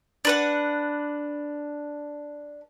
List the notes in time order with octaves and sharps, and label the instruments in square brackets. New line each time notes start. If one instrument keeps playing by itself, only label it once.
[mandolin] D4 B4 F#5